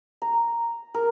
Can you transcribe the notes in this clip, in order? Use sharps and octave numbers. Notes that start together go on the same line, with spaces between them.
A#5
A#4